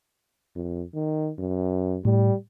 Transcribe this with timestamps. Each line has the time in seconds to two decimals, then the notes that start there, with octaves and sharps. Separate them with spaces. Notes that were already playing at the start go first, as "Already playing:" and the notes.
0.56 F2
0.95 D#3
1.39 F#2
2.05 A2 G3